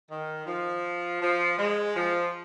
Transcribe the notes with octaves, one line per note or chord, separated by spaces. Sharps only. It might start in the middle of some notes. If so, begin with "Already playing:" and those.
D#3
F3
F3
G#3
F3